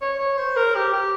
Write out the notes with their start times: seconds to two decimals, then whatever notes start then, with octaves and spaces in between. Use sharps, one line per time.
0.02 C#5
0.19 C#5
0.37 C5
0.56 A#4
0.75 G4
0.93 G4